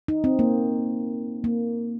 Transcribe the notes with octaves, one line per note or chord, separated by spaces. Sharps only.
D#4
C4
A#3
A#3